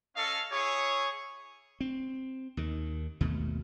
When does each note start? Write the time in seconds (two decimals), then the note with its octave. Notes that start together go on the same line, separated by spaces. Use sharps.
0.16 C#4 A4 D#5 F5
0.52 E4 G#4 C#5
1.81 C4
2.57 D#2 D#3
3.21 G#1 D#2 B2 A3